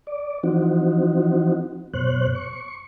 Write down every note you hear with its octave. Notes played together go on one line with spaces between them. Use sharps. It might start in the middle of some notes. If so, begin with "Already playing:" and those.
D5
E3 F3 C4 D#4 F#4
F#2 B2 C5 C#5 F#6
C#6